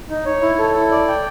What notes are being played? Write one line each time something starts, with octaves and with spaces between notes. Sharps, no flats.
D#4
C#5
E4
A4
E4
D5
G5